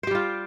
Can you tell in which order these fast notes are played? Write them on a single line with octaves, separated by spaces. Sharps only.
C5 G4 G3 F4